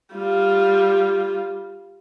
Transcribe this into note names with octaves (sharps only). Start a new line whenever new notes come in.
G3 F4